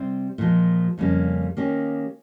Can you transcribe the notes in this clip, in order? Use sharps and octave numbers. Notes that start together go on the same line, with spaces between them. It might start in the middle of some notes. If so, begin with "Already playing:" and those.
Already playing: C3 G3 C4
A#2 F3 G#3
F2 C#3 G3 A#3 C#4
D#3 A#3 C#4 G4